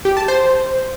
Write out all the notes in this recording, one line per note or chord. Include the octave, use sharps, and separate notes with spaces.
G4
A5
C5